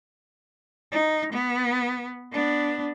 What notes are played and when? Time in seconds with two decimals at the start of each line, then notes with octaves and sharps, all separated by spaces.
0.92 D#4
1.33 B3
2.32 B3 D4